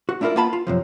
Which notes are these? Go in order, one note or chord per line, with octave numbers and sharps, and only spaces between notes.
F#4
A3 D4 E4 F4 A#4 D5
A#3 B3 F4 A5 B5
F4
F#2 C3 F3